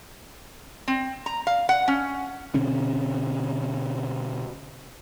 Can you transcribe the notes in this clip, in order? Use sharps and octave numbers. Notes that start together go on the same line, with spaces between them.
C4
A#5
F5
F#5
C#4
B2 D3 C4 C#4